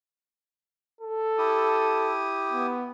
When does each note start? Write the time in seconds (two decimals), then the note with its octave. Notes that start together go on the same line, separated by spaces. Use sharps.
1.01 A4
1.38 E4 G4 D#6
2.52 B3